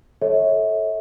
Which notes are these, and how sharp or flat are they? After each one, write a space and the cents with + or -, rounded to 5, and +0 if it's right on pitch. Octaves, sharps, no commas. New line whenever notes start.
A4 -10 C#5 -10 E5 -35